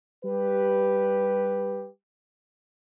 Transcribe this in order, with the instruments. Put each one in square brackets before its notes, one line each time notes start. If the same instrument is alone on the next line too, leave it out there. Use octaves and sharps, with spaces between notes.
[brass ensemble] G3 G4 B4